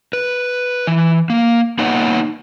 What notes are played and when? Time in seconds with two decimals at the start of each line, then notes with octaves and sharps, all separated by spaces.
0.13 B4
0.87 E3
1.30 A#3
1.79 A#3 B3 D#4 B4 C#5 F#5